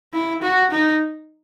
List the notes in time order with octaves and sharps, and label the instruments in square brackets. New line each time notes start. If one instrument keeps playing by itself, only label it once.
[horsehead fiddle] E4
F#4
D#4